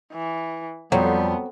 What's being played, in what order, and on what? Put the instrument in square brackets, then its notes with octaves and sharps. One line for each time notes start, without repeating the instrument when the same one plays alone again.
[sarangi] E3
[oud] F2 [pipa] F#3 [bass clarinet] G3 [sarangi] B3